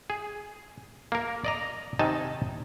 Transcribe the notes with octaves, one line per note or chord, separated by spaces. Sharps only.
G#4
A#3 A#4
D5 D#5 A#5
C3 D#3 D#4 D#5 G#5 A5